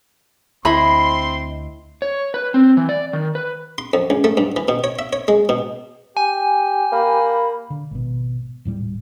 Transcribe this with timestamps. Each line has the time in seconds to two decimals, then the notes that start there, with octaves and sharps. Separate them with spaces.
0.65 D2 C4 E4 D#5 B5 C6
2.02 C#5
2.34 B4
2.54 C4
2.77 E3
2.89 D5
3.13 D#3
3.35 B4
3.78 C6
3.94 F2
4.10 C#2
4.24 A3
4.37 G2
4.56 E3
4.68 B2
4.84 C#5
4.99 E5
5.13 C#5
5.28 G#3
5.49 B2
6.17 G4 G#5
6.92 A#3 B5
7.70 D3
7.91 G#1 B2
8.65 D#1 A2 G3